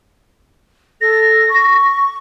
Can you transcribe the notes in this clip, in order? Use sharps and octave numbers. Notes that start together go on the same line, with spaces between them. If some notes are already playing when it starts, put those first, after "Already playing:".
A4 A#6
C#6